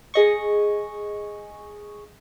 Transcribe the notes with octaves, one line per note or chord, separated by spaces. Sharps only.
G#4 D#5 C#6